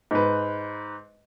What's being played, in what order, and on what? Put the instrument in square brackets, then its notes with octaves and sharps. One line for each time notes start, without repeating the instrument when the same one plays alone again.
[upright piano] G#2 B4